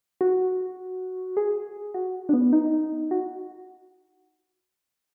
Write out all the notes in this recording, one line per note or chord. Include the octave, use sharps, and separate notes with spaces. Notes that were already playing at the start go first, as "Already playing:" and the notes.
F#4
G#4
F#4
D4
B3
D#4
F#4